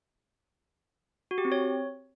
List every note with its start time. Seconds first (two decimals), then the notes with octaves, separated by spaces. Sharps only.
1.31 F#4
1.38 G4
1.45 C4
1.52 C#5